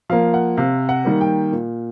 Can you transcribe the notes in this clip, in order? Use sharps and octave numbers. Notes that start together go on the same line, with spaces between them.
F3 A#3 F5
F#5
C3 F5
F#5
D#3 G3 A#3
G5
A#2